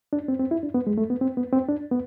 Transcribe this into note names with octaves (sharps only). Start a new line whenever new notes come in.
D4
C4
C4
E4
D4
B3
G#3
A3
B3
C4
B3
C4
D4
B3